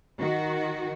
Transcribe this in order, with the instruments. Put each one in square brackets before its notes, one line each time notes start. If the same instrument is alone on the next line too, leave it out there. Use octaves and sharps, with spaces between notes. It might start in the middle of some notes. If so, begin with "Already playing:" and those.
[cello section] D#3 F#4